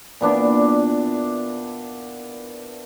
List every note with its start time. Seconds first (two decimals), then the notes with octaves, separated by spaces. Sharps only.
0.21 A#2 B3 D4 E4